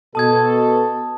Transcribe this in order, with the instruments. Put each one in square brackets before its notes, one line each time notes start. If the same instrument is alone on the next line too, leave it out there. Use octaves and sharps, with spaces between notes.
[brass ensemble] B2 A4 [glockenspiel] A5 D#6 G#6